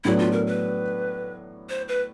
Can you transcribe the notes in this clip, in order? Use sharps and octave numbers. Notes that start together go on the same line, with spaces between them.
A2 F#3 B3 D4 E4
F4
A#4
B4
C5
B4